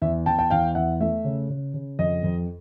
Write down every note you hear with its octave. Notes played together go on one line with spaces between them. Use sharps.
E2 E5
E2 G5 A5
G5 A5
E2 F5 G5
E2 E5 F#5
A3 E5
C#3
C#3
C#3
F2 D#5
F2